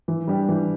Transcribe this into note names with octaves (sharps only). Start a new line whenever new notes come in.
E3
G3 D4 G4
E3